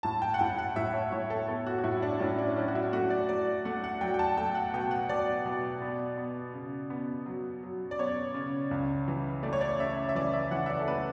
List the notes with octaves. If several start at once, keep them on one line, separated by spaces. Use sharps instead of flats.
A2 A5
G5
F#5
A2 G5
F#5
A2 E5
C#5
A2 C#5
A4
B3 A4
F#4
F#4
A2 E4
D4
A2 C#4
D4
F#3 C#4
F#4
E4
A3 F#4
D5
F#3 D5
A3 F#5
F#5
F#3 G5
G5
A5
A3 G5
F#5
B2 G5
F#5
B2 D5
B2
B3
B3
C#3
B3
F#3
F#3
D5
B3 C#5
C#3
C#2
E3
A3 D5
C#5
D5
C#3 E5
E5
E3 D5
E5
E3 F#5
E5
D5
A4
A3 B4